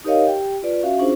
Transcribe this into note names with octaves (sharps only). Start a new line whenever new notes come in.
D#4 G4 A#4 C#5 D#5 F5
G4 G5
F4 B4 D5
C#4 F#4 E5 F5
C#4 D4 F4 G#4 C5